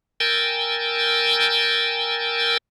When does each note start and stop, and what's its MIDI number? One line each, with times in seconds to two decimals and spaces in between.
0.20 2.57 70
0.20 2.57 79
0.20 2.57 80
0.20 2.57 88
0.20 2.57 91
0.20 2.57 93